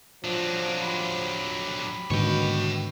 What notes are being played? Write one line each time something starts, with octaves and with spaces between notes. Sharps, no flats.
F3 F#3 D4
G4 B5
G#2 B2 D3 D#3 C#5 G5